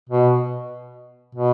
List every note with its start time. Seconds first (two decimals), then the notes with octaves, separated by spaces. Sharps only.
0.09 B2
1.35 B2